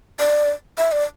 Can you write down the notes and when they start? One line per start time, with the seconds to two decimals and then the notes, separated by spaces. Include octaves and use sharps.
0.19 D5
0.78 E5
0.92 D5